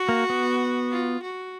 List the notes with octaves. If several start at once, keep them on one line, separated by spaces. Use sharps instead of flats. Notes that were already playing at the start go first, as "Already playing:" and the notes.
Already playing: F#4
A#3
B3
F4
F#4